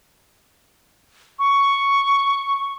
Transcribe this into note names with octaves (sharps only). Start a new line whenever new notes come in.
C#6